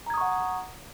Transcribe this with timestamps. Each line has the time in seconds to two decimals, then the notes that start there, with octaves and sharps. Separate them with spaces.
0.06 A#5
0.10 G#6
0.14 D#6
0.17 C#6
0.21 F#5